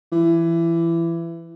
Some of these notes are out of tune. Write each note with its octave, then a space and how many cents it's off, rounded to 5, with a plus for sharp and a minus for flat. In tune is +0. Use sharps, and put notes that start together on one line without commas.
E3 +20